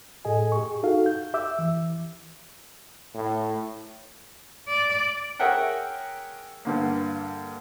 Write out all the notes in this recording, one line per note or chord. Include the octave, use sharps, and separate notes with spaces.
A2 G#4 A4 D#5 G#5
G4 G#4 C#6
D#4 F#4 A4 F5
G6
G4 E5 D6 E6
E3
A2
D5
G#4 A#4 C#5 E5 F#5 G5
G2 D3 A#3